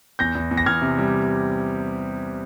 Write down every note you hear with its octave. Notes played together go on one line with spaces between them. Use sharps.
E2 G6 A#6
E2
E2
A#6
E2 F6 G#6
C3
G3